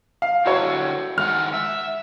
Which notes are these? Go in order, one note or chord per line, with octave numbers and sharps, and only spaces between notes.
F5
D3 E4 F#4 G4 C#5
D#3 G#3 F#5 F6
E5